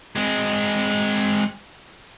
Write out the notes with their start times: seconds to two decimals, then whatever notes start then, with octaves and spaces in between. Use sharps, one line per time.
0.16 G#3 C4